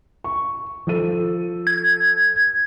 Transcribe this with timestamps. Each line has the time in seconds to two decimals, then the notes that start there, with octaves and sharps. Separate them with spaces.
0.24 C#6
0.87 F3 A4 D#7
1.67 G#6